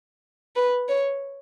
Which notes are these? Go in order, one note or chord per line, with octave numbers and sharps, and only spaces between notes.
B4
C#5